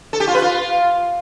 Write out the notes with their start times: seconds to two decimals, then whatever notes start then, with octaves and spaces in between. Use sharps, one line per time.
0.13 A4
0.20 G4
0.27 F4
0.35 B4
0.42 F4